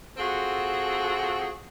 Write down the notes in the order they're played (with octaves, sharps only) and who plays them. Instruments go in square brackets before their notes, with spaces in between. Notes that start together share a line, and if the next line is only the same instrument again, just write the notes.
[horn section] C4 F4 F#4 G#4 A4